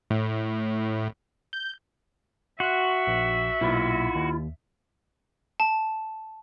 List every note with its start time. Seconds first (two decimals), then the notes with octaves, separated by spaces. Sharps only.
0.10 A2
1.53 G6
2.60 F#4 E5 C6 C#6 F#6
3.07 A#1
3.61 B1 A#2 E4 F4
4.15 D#2
5.60 A5